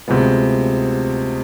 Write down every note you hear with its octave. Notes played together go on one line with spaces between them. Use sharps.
D2 C3 F3 G#3 B3